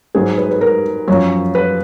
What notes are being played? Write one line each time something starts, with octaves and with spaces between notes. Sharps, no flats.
G#2 F#3 G#4
B4
B4
A#4
F#2 F3 C#5
B4